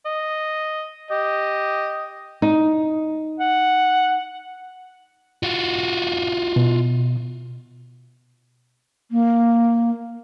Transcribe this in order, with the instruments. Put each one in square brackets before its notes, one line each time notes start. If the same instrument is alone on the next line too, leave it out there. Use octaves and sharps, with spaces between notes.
[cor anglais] D#5
[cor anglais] G4 [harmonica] D#5
[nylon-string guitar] D#4
[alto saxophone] F#5
[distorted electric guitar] F4 F#4
[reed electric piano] B2
[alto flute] A#3